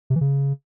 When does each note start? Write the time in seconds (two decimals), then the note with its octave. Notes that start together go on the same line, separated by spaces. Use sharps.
0.10 C3
0.16 E3
0.21 C#3